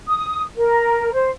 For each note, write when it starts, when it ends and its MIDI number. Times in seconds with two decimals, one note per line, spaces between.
0.07 0.43 87
0.57 1.11 70
1.14 1.30 72